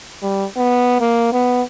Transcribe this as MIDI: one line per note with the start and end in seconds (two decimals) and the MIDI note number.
0.22 0.45 55
0.57 0.98 59
1.01 1.28 58
1.33 1.62 59